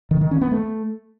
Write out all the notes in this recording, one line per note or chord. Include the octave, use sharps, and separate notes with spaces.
D#3
D#3
C#4
B3
A3